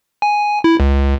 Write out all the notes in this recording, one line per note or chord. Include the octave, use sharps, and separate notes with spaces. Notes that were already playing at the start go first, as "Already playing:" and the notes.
G#5
E4
C#2